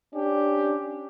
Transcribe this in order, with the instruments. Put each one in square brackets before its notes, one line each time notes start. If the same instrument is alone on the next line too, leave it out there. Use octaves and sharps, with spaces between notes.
[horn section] C#4 D4 G4